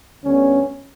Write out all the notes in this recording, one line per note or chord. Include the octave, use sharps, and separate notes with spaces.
D2 D3 G3 B3 C#4